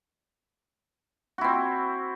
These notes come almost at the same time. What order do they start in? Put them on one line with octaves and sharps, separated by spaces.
F#4 E4 C4